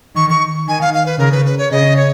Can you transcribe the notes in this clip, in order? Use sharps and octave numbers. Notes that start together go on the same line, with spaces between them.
D#3 C#6
C#6
D#3 G#5
F5
F5
B4
C#3 A#4
B4
B4
C#5
C#3 D#5
C#5